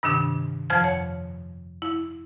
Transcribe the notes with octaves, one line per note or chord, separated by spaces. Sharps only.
G2 C3 D#3 D4 D#6
F2 F3 C5 A5 F6 G#6
C#5
E4